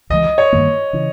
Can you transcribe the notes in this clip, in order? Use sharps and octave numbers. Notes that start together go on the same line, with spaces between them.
C#2 C#3 E3 G#3 D#5
C#5
G2 D#3 A#3
C#3 E3